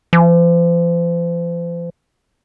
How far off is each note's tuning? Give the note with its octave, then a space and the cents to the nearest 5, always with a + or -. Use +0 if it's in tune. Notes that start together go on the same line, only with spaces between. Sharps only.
F3 -40